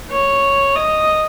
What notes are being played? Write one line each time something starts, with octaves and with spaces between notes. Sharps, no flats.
C#5
D#5